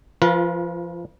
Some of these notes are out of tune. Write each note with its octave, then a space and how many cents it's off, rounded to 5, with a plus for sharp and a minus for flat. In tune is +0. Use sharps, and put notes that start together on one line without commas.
F3 -25 F4 +0 B4 -40